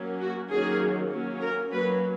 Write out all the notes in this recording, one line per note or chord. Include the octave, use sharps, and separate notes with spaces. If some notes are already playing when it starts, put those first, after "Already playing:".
Already playing: F#3 A#3 C#4
F#4
D#3 F#3 A#3 C#4 G#4
F#3 A#3 C#4
A#4
F#3 A#3 C#4 B4